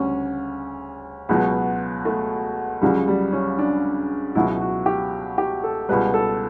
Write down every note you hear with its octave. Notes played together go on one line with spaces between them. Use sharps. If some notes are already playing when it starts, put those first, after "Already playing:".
Already playing: D2 C#3 G3 C#4
C#2 B2 F#3 B3
A3
C#2 C#3 F#3 G3
G3
C#4
D4
C#2 B2 F#3 E4
F#4
G4
G4
A4
C#2 B2 G3 B4
A4